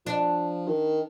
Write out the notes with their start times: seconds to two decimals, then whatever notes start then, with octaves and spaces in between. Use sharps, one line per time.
0.06 F3 D4
0.68 D#3